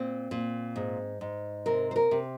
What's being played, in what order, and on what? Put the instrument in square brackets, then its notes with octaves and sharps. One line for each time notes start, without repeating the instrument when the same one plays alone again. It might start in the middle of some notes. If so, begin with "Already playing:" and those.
Already playing: [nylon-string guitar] A#2 C4
A#2
G#2
G#2
C3 A#4
C5
A#4
C3